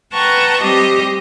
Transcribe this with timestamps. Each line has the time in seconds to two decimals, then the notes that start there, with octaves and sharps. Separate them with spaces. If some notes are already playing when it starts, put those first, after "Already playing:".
0.13 B4 F#5 G5 A5 A#5 C#6
0.61 G3 C4 G4 D#5